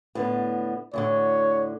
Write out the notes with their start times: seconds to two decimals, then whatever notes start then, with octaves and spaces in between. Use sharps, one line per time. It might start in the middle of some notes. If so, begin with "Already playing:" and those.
0.15 A2 D3 B3
0.93 D2 A2 D3 C#5